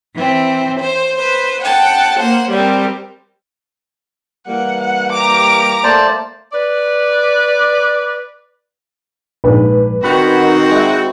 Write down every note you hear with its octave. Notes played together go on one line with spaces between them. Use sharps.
E3 C4
C5
B4 C5
F#5 G5 A5
A#3 C5 F#5
G3 C4 A#4
E3 G3 A#3 F#5
F#5
G4 A#5 D6 D7
A3 A#3 C5 D5 A5
B4 D5
A#1 G#2 D4 B4
D#3 C4 F#4 F#5 B5
G#3 E4